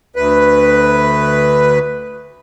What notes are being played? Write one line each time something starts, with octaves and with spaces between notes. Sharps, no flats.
D2 B4